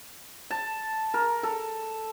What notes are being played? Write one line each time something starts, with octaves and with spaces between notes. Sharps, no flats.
A5
A#4
A4